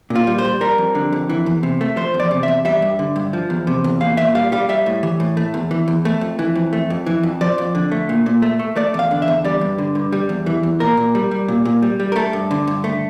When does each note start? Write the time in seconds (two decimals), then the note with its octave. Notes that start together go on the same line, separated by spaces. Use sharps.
0.10 A#2
0.16 F4
0.27 G3
0.38 C5
0.45 G3
0.61 G3 A#4
0.78 F2
0.95 D3
1.13 F2
1.29 E3
1.46 E2
1.63 C3
1.81 A3
1.97 F3 C5
2.14 E2
2.20 D5
2.31 C3
2.43 E2 E5
2.65 G3 E5
2.82 G2
2.99 D3
3.16 G2
3.33 F3
3.50 E2
3.67 C3
3.84 E2
4.00 A#2 F5
4.17 A#2 E5
4.35 G3 F5
4.52 G3 F5
4.69 G3 E5
4.86 A2
5.03 E3
5.20 A2
5.37 A3
5.54 E2
5.71 E3
5.88 E2
6.05 A3
6.21 F2
6.39 E3
6.55 F2
6.73 A3
6.90 F2
7.06 E3
7.23 F2
7.41 F3 D5
7.58 F2
7.75 D3
7.92 A3
8.09 A#2
8.26 A#2
8.42 A3
8.59 A3
8.76 A3 D5
8.94 E2 F5
9.11 D3
9.22 E5
9.28 E2
9.44 G3 D5
9.61 G2
9.78 D3
9.95 G2
10.13 G3
10.29 E2
10.46 E3
10.63 E2
10.80 A#2 A#4
10.97 A#2
11.15 G3
11.31 G3
11.48 A#2
11.65 A#2
11.82 G3
12.00 G3
12.12 A#4
12.16 A3 A4
12.33 G2
12.51 D3
12.67 G2
12.84 A3